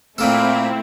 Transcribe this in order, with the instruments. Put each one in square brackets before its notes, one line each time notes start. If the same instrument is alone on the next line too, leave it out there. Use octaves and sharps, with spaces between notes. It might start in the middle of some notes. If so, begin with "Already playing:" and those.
[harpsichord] A#2 A#3 A4 [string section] A3 C4 E4